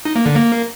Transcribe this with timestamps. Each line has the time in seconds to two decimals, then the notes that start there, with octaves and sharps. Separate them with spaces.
0.05 D#4
0.16 A#3
0.26 D3
0.36 A#3